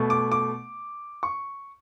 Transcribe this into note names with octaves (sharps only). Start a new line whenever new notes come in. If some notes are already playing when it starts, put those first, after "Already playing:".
Already playing: B2 A3
D6
D6
C#6